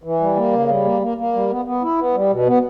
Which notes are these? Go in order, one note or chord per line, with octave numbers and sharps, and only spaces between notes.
E3
G3
A#3
C#3
G3
A#3
A#3
A#3
G3
B3
B3
E4
B3
G3
B2
B3